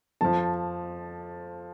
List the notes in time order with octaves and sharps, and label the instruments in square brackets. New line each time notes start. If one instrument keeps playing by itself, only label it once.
[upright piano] F2 F3 A5